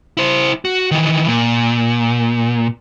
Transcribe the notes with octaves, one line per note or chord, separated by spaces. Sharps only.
E4 C5
F#4
D#3 E3
A#2